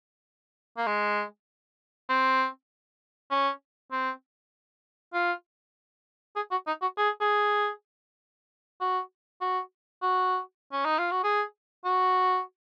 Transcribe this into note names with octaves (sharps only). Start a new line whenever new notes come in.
A#3
G#3
C4
C#4
C4
F4
G#4
F#4
D#4
F#4
G#4
G#4
F#4
F#4
F#4
C#4
D#4
F4
F#4
G#4
F#4